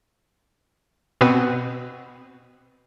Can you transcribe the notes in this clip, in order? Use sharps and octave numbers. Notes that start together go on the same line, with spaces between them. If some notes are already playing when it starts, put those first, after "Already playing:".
B2 B3 C4 F#4 B4